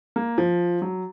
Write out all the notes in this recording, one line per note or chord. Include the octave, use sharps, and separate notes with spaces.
A#3
F3
F#3